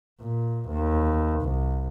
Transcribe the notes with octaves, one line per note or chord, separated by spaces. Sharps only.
A#2
D#2
C2